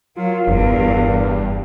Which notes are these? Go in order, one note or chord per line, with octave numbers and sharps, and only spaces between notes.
F#3 F4 A#4 F5
F#1 E2 G2